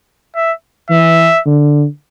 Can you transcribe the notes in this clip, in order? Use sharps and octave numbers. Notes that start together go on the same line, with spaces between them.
E5
E3 E5
D3